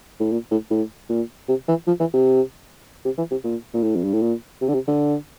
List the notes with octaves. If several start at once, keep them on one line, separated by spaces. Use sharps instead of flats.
A2
A#2
A2
A2
A#2
C3
E3
F3
E3
C3
C3
E3
C3
A#2
A#2
A2
F2
G2
A2
A#2
C3
D3
C3
D3